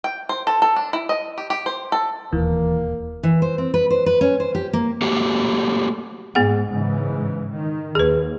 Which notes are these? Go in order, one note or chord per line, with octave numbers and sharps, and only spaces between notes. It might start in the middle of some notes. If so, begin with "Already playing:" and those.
G5
C5
A4
A4
D4
E4
D#5
G4
G4
C5
A4
E1 D#2 E3 A#3
E3
C5
C4
B4
C5
B4
C#4
C5
G4
A#3
A3 A#3 F#4 G4
G#2 B3 G#4 F#5
G#2 C#3 E3
D#3
D#2 G#4 B4